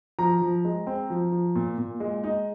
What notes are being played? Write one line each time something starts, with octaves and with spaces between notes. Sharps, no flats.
F3 A#5
F3
G#3
C4
F3
F3
A#2
A#2
G#3
D#4